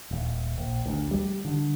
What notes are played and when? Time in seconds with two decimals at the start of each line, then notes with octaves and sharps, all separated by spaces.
0.11 D#1
0.58 A#1
0.86 D2
1.11 G3
1.45 D3